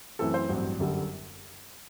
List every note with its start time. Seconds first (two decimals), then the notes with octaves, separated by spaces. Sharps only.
0.19 F#2 E3 A3 C4 A4
0.34 C5
0.49 A1 G2 F#3 C4
0.79 G1 F#2 D3 G3